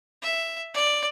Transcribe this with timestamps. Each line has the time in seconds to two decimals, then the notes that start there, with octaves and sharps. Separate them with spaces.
0.22 E5
0.74 D5